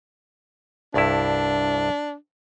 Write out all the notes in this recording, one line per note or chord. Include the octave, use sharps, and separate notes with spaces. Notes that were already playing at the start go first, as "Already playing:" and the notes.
C2 G2 D4 E4